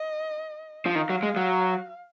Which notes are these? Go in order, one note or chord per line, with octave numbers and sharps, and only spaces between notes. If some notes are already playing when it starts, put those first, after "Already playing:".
Already playing: D#5
F3
D#3 F5
F#3
G#3
F#3